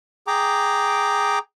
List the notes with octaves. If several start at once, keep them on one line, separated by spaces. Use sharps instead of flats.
G#4 G5 A#5 D6